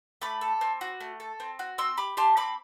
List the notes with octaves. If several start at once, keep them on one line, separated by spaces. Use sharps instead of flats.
A3 B5 D6
A4
C4
F#4
A3
A4
C4
F#4
C4 C6 E6
G4 B5 D6
G4 A5 C6
C4 B5 D6